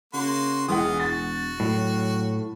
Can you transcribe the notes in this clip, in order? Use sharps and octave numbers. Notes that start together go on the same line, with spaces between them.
C#3 A#3 F#4 C6
E1 E3 G#3 F4 F#5 D#6
F#4 A6
A2 F#3